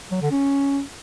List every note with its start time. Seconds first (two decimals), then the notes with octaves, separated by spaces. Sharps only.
0.11 F#3
0.21 D3
0.31 C#4